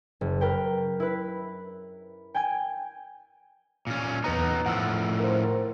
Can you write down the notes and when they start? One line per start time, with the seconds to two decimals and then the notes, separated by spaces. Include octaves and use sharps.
0.21 F#1
0.41 A#4 B4 G5
1.00 E4 B4
2.34 G5 G#5 G#6
3.87 A#2 C#4
4.24 E2 B3 D#4 B4 A#5
4.66 A2 F3 F#5 E6
5.20 A#4 C5